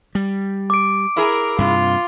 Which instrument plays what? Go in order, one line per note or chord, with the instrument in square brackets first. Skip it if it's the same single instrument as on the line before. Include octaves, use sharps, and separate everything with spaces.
[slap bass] G3
[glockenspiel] D6 D7
[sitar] E4 G#4 [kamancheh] A#4
[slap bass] G2 C3 [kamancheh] F4